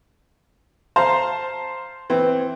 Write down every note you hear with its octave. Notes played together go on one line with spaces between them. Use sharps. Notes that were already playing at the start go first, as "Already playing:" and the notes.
C5 F5 A5 A#5 C6
E3 C4